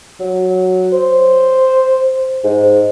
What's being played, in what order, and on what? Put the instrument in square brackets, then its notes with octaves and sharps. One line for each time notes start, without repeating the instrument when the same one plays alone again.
[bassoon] F#3
C5
G#2